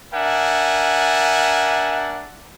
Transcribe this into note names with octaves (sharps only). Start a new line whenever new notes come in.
D4 A#4 E5 F#5 G#5